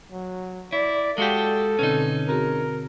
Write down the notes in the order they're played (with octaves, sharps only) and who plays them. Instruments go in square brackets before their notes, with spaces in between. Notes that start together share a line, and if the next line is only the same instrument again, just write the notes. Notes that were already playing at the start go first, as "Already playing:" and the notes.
[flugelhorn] F#3
[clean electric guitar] E4 [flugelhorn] D5
[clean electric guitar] G#3 F#4 G4 [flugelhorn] A4 [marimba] F5
[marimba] B2 D3 C4 [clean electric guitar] C#4 D#4
[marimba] C4 F#4 G#4 [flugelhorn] A#4